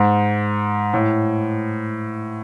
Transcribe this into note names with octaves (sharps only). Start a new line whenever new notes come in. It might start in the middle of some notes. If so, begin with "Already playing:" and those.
Already playing: G#2
A2